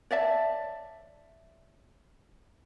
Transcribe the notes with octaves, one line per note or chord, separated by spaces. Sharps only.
C#5 D5 E5 A5